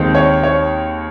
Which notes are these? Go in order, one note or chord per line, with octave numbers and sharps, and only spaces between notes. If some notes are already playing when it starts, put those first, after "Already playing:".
Already playing: D#2 D#3 G#3 C4
C#5
C#5